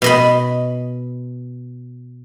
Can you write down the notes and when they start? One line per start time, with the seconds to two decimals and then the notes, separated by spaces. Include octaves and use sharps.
0.02 B2 D#5 B5